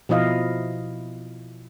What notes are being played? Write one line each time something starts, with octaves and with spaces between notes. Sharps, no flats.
B2 F3 E4 D#5 F5